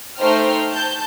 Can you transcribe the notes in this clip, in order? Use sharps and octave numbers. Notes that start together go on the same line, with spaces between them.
A3 D#4 C5 G5 F6
A5 G6